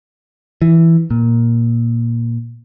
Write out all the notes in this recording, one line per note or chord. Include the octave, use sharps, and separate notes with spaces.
E3
A#2